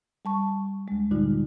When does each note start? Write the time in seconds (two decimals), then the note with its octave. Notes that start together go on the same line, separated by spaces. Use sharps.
0.25 G3 A5 C#6
0.88 D2 G#3
1.11 G2 A#2 D3 G3 D#4 F4